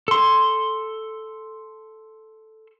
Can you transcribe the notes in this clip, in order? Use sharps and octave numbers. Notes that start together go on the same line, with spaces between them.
A4 C6